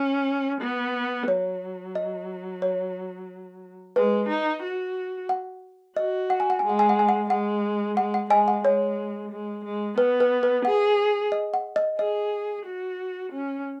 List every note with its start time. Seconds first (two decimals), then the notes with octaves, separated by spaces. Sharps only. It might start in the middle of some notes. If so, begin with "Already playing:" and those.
Already playing: C#4
0.61 B3
1.28 F#3 C#5
1.95 D#5
2.62 C#5
3.96 G#3 B4
4.29 D#4
4.63 F#4
5.29 F#5
5.97 F#4 D#5
6.30 F#5
6.40 G#5
6.50 F#5
6.59 G#3 G#5
6.69 F#5
6.79 G#5
6.89 F#5
6.99 G#5
7.09 F#5
7.30 G#3 F#5
7.97 G#3 F#5
8.14 F#5
8.30 G#3 D#5 G#5
8.48 F#5
8.64 G#3 C#5
9.31 G#3
9.65 G#3
9.98 B3 B4
10.20 B4
10.43 B4
10.65 G#4 F#5
11.32 D#5
11.54 F#5
11.76 D#5
11.99 G#4 D#5
12.65 F#4
13.32 C#4